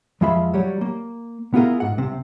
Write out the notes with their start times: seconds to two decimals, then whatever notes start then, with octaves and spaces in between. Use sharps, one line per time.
0.21 F2 F3 G#3 F4 E5 B5
0.53 F#3 G3 C#5
0.81 A#3
1.54 B3 E4 F4 G#4 A#4
1.80 G#2 F#5
1.97 C2 C3